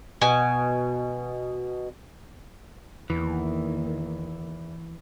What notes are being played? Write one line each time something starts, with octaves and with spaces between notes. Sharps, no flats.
B2 G#5
E2 D#3 E3 A#3